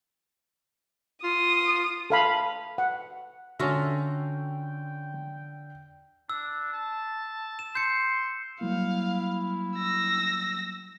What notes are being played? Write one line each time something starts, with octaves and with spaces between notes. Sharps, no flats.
F4 D#6
A4 F5 B5
F#5
D3 C#4 F4 F#4 A4 E5 G5
D4 E6
A5
E7
C6 G6 C#7
F#3 G3 A#3 E4 F5
E6 A#6